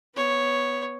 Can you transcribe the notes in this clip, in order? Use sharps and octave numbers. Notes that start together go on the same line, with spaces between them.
B3 C#5